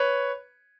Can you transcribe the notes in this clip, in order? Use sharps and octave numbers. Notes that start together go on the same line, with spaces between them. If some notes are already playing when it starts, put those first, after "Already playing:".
Already playing: B4 C#5